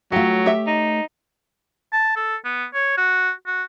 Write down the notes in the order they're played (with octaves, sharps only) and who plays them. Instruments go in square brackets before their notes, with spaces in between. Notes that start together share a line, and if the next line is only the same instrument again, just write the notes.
[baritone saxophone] F#3 [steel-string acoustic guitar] A3 C#5 [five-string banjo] F4 G4
[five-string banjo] G4 E5
[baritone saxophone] D#4
[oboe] A5
A4
B3
C#5
F#4
F#4